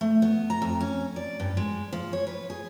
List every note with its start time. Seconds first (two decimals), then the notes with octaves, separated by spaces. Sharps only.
0.01 A3
0.22 B3
0.50 A#5
0.62 F2
0.80 C#4
1.16 D5
1.40 G2
1.57 G#3
1.92 F3
2.13 C#5
2.27 B4
2.50 G#4